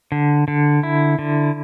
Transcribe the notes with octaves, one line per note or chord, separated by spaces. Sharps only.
D3
D3
E4
D3